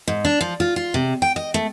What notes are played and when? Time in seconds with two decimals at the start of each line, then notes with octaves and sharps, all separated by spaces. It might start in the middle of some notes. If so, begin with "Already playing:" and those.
0.08 G#2
0.25 D4
0.41 F3
0.60 F4
0.76 F4
0.94 C3
1.22 G5
1.36 D#5
1.54 A3